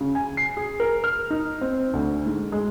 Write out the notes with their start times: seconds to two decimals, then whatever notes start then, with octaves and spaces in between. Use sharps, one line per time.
0.01 C#3
0.15 G#5
0.37 C7
0.57 G#4
0.80 A#4
1.04 F6
1.30 D#4
1.61 C4
1.93 D2
2.26 G#2
2.52 G#3